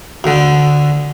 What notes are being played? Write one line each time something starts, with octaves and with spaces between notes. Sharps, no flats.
D2 D3